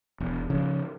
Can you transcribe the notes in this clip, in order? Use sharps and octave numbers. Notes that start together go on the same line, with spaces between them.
E1
C#3 F3